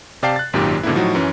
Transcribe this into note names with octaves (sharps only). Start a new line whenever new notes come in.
C3 D5 F5 G5 A5 C7
F#6 A6
G#1 F#2 A#2 D#3 G4 A#4
G#2 B2 D3 D#3 A#3 E4
A2 F3 F#3 D#4 F#4
F#2 E3 C#4